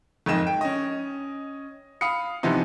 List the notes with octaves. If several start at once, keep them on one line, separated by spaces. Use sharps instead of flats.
F#1 F2 G#2 D#5 E7
G5
C#4 D#5
F5 B5 D#6 C#7
C3 E3 F3 B3 D#4